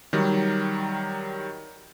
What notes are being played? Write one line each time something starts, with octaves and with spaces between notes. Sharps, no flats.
D#3 F#3 G3